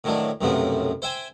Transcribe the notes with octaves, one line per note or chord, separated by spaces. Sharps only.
A2 D#3 E3 F#3 D4
B1 F#2 A2 C3 F3 B3
C5 E5 G5 G#5